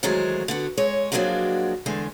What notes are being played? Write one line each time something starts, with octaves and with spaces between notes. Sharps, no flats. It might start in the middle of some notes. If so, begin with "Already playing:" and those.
D#3 E3 F#3 G#3 A3 C5
D3 B3 F#4
G#3 C#5
F3 F#3 G#3 A#3 D4 F#4
E2 D3 G#3